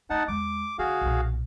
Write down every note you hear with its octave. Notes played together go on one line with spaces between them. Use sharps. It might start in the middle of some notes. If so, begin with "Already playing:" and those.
A3 D#4 F#5 A5
E2 G#3 D6
D3 F#4 G#4 F5
B1 A#2